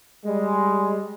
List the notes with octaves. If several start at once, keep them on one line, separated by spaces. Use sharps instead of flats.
G3 G#3